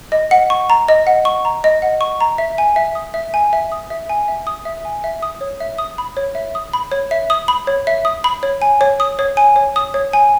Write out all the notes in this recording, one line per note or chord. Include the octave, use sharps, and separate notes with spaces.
D#5
F#5
C#6
A#5
D#5
F#5
C#6
A#5
D#5
F#5
C#6
A#5
E5
G#5
E5
D#6
E5
G#5
E5
D#6
E5
G#5
E5
D#6
E5
G#5
E5
D#6
C#5
E5
D#6
B5
C#5
E5
D#6
B5
C#5
E5
D#6
B5
C#5
E5
D#6
B5
C#5
G#5
C#5
D#6
C#5
G#5
C#5
D#6
C#5
G#5